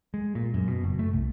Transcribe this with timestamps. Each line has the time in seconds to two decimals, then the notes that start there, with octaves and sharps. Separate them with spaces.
0.14 G#3
0.35 A#2
0.54 F#2
0.68 B2
0.84 F#1
0.99 A3
1.13 C2